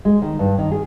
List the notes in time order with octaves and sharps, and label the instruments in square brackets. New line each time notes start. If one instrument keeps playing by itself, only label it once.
[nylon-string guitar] G#3
D#3
G2
D#3
G#4